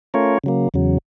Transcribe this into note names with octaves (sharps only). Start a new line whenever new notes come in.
A3 C#4 F4 A#4 C#5
C#3 F#3 A#3
E2 C#3 F#3